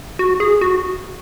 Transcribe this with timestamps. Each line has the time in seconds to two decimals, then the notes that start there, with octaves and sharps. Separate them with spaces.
0.19 F#4
0.40 G#4
0.61 F#4